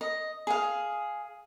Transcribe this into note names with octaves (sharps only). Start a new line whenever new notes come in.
D#5
G#4 F5